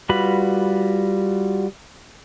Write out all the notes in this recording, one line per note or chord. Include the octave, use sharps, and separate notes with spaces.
G3 F4 F#4 B4 B5